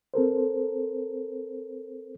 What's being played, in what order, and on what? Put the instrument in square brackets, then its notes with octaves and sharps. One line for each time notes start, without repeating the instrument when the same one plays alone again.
[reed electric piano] C4 A4 A#4 C5